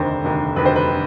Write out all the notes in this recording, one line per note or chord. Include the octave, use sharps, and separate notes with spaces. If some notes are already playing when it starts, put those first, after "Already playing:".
Already playing: F1 D#2 D3 C5
F1 D#2 D3
F1 D#2 D3 B4
C5
B4
D3